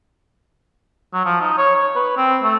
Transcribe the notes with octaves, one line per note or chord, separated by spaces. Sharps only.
F#3
F3
D#4
C#5
C#5
B4
C4
A3